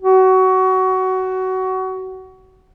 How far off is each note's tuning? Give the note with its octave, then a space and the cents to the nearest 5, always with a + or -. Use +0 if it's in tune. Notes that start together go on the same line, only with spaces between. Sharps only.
F#4 +20